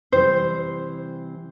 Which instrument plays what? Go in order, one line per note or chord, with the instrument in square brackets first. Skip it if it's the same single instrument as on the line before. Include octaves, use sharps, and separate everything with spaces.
[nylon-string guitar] C3 E3 G3 [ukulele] C5